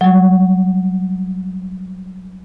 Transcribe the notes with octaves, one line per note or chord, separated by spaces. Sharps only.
F#3 G3